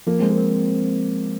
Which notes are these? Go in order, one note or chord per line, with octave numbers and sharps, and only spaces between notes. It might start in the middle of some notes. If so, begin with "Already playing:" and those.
F3 A#3
G#3 C4
A#3
C4